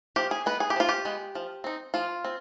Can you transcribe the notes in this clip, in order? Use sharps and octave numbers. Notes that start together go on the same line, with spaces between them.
F3 G4
G#4
G#3 B3 B4
G#4
G4
F3 F4
G4
G#3 B3
F3
C4 D#4
F3 F4
C4